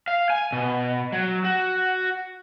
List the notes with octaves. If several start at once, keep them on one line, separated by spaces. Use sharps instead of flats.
F5
G#5
B2
F#3
F#4